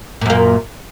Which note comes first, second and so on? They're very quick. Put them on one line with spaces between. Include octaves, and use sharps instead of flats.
A#2 F#2 A#3